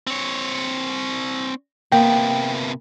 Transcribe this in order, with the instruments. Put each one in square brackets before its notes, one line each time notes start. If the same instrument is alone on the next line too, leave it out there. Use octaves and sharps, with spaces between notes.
[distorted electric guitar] C4 C#5
[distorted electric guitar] C3 B3 [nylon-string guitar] A#3 [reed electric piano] G5